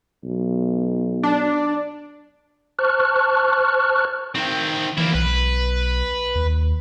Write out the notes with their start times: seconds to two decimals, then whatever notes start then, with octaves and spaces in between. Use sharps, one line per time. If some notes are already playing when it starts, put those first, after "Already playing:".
0.24 B1
1.23 D4
2.79 C5 A5 C#6 F6 F#6
4.35 D#3 C4
4.98 E3 A#3 E4
5.15 B1 B4
6.35 D#2